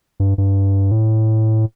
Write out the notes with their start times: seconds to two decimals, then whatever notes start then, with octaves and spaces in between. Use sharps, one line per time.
0.20 G2
0.38 G2
0.91 A2